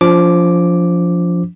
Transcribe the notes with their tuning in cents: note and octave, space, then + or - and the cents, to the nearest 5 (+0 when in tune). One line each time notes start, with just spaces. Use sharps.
F3 +0 D4 -40 D6 +0